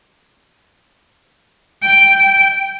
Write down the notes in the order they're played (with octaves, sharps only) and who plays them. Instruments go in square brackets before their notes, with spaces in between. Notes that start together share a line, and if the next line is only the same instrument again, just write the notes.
[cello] G5